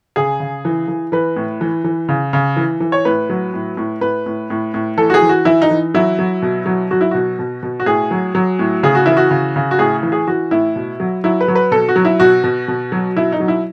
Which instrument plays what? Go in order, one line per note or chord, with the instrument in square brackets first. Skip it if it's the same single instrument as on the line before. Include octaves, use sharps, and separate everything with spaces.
[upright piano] C#3 G#4
C#3
E3
E3
E3 B4
A2
E3
E3
C#3
C#3
E3
E3
C#5
A2 B4
F#3
A2
A2
A2 B4
A2
A2
A2
E3 A4
F#4
G#4
E3
F#4
E3 E4
D#4
E3
F#3 E4
F#3
B2
F#3
F#3 F#4
E4
B2 F#4
B2
B2
F#4
A2 G#4
F#3
F#3
A2
C#3 G#4
F#4
E3 E4
F#4
C#3
C#3
F#4
A2 G#4
E3
G#4
E3 F#4
A2 E4
B2
F#3
F#3 E4
B4
F#3
B4
B2 A4
F#4
F#3
E4
B2 F#4
B2
B2
F#3
B2 E4
D#4
F#3
E4